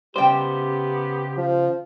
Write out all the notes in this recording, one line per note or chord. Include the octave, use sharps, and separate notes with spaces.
C#3 G3 B3 G4 C5 G5
F3